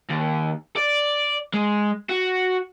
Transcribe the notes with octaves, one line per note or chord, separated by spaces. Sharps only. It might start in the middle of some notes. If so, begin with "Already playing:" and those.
D#2
D5
G#3
F#4